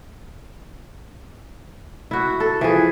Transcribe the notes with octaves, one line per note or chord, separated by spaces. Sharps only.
E4 F#4
A4
E3 F3 G#4